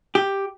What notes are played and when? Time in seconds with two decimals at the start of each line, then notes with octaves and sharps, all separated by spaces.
0.15 G4